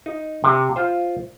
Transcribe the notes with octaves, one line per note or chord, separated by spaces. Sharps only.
D#4
C3
F4 C5